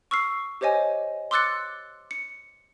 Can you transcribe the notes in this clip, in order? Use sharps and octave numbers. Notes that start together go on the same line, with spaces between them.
C#6 E6 F6 C7
G4 C5 C#5 D#5 G#5
C6 D6 E6 F#6 A6 C#7
C#7